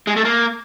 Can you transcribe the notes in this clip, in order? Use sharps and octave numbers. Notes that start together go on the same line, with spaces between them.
G#3
A3
A#3